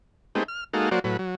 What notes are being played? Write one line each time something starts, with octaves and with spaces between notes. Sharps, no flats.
G#3 A3 B3 C4 D#4 G4
F6
G#3 A#3 D#4 F#4 A4 F5
F#3 A#3 F#4 C5 D5
A2 F#3 B4
F#3